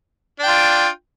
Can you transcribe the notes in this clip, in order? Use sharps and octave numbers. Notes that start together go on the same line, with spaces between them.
D4 F4 G5